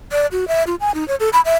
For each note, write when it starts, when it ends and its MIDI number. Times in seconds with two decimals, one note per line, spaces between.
0.12 0.26 74
0.32 0.47 66
0.48 0.63 76
0.67 0.75 65
0.80 0.94 80
0.94 1.06 63
1.08 1.15 73
1.20 1.29 69
1.33 1.41 83
1.45 1.57 76